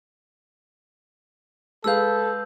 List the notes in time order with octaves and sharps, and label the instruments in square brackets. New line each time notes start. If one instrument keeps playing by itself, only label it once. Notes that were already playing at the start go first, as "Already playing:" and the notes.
[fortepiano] G#3 B4 F5 [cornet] A4 [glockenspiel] E6 G6